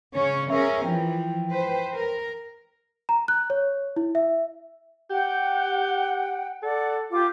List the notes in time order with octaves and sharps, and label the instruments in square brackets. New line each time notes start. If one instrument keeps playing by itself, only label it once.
[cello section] C#3 C#4 C#5
[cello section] C#4 G#4 A#4 [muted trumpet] E5
[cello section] E3 F3 [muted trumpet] G5
[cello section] B4 C5
A#4
[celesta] A#5
F#6
C#5
E4
E5
[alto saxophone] G4 [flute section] F#5 G5
[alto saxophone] A4 [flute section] D5 F#5
[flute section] F4 G4 D6